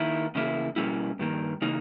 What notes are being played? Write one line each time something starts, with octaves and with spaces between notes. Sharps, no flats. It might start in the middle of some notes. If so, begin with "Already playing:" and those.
Already playing: D#3 A#3 E4
E2 C#3 A#3 E4
B2 G3 A#3 C#4 E4
G2 D#3 A#3
C#3 E3 A#3 D#4